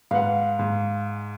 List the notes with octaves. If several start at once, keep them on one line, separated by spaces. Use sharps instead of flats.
G#2 B4 F5 F#5
G#2